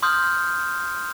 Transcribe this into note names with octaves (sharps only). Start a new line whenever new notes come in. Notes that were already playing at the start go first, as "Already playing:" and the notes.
C6 D#6 F6 G6